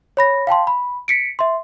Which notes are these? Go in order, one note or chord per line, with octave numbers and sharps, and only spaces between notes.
C#5 B5 A#6
F5 G5 A5 C6
B5
B6 C#7 D7
E5 C6